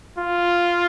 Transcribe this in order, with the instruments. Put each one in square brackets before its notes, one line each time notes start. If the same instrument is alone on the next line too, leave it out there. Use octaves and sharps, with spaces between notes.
[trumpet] F4